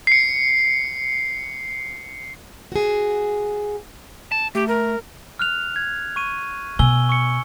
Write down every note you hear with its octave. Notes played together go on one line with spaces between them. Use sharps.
C7 C#7
F#4 G#4
A5
A3 G4
A#4
F6 F#6 F7
G#6
C#6 D#7
B2 G#5 E6 G7
C#6 C#7